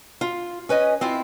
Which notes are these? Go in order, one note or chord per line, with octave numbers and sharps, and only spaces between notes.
F4
C#4 B4 D#5 G#5
C4 E4 F4